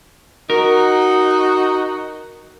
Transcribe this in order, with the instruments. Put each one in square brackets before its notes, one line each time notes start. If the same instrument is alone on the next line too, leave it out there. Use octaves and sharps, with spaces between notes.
[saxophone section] D#4 F#4 [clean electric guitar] A#4